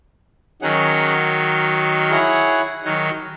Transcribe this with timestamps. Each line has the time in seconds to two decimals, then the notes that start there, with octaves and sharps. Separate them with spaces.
0.62 D#3 F#3 C#4 G#4 C#5 F#5
2.10 E4 G#4 C#5 F#5
2.84 D#3 F#3